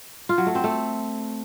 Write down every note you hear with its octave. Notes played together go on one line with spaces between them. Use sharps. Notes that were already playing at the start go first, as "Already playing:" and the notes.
F4
F#3
A3
C4
A3